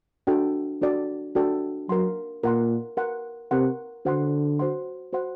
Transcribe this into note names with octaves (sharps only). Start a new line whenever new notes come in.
D4 F#4 A4 D5 G5
D4 F#4 A4 D5 G5
D4 F#4 A4 D5 G5
F#3 A#4 F#5 C6
A#2 A#4 F#5 C6
A#4 F#5 C6
C3 A#4 F#5 C6
D3 F#4 C5 F#5 C6
F#4 C5 F#5 C6
F#4 C5 F#5 C6